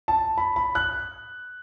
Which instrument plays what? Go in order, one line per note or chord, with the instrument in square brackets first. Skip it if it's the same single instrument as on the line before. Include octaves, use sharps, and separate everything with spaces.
[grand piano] A5
B5
B5
F#6